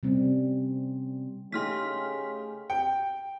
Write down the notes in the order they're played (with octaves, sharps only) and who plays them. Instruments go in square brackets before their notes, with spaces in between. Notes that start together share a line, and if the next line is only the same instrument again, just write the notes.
[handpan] C3 G3 C4 C#4
[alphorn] C#3 [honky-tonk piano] A3 D#4 G4 [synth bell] C6 F6 B6
[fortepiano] G5